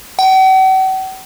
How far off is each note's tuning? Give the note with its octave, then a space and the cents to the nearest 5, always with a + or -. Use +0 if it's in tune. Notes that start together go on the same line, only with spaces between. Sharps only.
F#5 +45